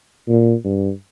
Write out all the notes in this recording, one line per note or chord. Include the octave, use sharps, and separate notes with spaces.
A#2
G2